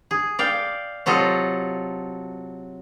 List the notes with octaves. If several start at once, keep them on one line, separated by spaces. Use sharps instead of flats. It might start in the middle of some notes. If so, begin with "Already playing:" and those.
G#4
D5 F5 G5
C3 F#3 F4 A4 D#5